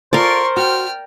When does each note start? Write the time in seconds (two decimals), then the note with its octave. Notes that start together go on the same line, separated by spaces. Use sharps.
0.13 F4 A4 A#4 C5 D5 C6 C#6
0.57 F#4 G5 F6